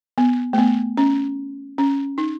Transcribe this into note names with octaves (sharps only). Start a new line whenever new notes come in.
B3
A3
B3
C#4
C#4
D#4